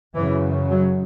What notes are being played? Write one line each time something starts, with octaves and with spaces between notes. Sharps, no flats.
F#2 C#3 E3
F#3